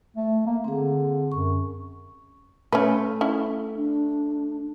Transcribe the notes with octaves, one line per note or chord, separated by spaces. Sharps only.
A3
A#3
D3 C4 G#4
F#2 C#6
A3 C#4 B4
C#4 E4
D4